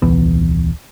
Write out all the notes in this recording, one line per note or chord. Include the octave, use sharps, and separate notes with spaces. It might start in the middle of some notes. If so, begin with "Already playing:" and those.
D#1 C2 E3 B3